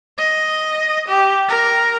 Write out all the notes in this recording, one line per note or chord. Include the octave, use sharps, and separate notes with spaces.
D#5
G4
A#4